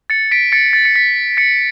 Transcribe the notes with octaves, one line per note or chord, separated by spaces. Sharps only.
A6 C#7
B6 D7
A6 C#7
A6
C#7
B6
A6 C#7